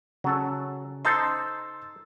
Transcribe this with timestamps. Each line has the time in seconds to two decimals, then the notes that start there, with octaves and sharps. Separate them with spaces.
0.24 C#3 F#3 C#4 A4
1.05 D#4 A4 C5 C6 E6 A6